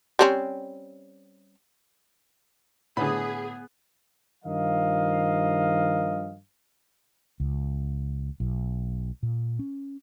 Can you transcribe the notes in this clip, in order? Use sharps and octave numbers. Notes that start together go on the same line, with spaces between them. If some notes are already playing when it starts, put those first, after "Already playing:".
G3 C4 C#4
A2 D3 B3 G#4 B5
G2 D#3 F3 A#4 D#5 F5
C#2
B1
A#2
C#4